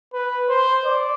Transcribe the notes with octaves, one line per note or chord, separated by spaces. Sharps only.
B4
C5
D5